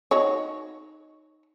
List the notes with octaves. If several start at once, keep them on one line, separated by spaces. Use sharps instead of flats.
D#4 F#4 C#5